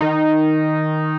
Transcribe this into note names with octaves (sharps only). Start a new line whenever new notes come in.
D#3 D#4